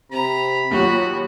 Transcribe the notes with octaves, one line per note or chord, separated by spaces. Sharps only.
C3 A#5 B5
D#2 A#2 F#3 F#4 G4